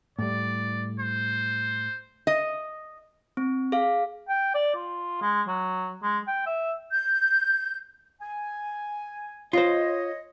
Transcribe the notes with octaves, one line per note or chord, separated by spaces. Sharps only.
A2 G3 D5
C5
D#5
C4
G#4 F5
G5
D5
F4
G#3
F#3
G#3
G5
E5
G6
G#5
F4 C5 C#5 D#5